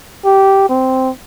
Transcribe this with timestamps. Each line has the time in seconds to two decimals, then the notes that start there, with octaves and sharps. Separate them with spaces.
0.24 G4
0.69 C4